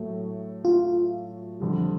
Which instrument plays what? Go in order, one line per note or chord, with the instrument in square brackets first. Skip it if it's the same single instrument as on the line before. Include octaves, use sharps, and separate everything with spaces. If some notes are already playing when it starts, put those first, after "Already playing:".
Already playing: [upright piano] A2 F#3 A3
[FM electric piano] F4
[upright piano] F2 D3 G3